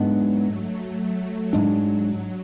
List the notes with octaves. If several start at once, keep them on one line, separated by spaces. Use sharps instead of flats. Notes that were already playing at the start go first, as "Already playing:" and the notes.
Already playing: G#2 F#3 G#3 B3 D4
A3
G#2 F#3 G#3 D4